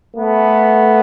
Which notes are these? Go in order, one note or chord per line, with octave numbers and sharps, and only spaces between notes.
A3 B3